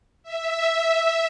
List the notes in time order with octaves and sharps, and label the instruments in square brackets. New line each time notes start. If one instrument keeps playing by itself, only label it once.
[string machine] E5